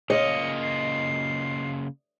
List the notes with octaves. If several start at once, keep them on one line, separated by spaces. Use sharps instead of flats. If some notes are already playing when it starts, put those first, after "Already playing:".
C#3 A#3 F4 D#5 C#7
C7